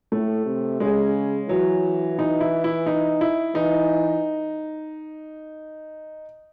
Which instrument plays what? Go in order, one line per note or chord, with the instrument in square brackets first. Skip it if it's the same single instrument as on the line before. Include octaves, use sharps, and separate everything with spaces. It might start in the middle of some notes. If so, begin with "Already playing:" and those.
[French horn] A2 [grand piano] A3
[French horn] C3
[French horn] C#3 [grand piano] G#3
[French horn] E3 [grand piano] F#3
[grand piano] D#4
E4
E4
D#4
E4
[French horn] E3 [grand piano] D#4